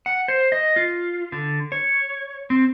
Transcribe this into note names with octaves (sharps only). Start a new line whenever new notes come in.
F#5
C5
D#5
F4
D3
C#5
C4